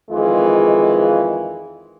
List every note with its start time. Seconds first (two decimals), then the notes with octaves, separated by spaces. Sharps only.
0.10 F2 D#3 E3 G#3 F4